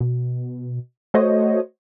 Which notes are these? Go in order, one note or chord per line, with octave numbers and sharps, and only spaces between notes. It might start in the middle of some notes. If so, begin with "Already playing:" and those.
B2
A3 F#4 C5 C#5 D#5